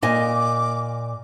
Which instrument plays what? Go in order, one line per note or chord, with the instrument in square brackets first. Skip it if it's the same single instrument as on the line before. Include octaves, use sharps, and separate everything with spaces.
[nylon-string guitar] A#2 D#5 G#5 [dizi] D6